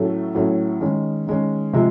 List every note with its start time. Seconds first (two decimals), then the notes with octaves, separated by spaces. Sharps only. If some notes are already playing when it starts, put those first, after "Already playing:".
Already playing: A2 F#3 A3 C#4
0.35 A2 F#3 A3 C#4
0.81 D#3 G#3 C#4
1.27 D#3 G#3 C#4
1.73 C3 F3 G#3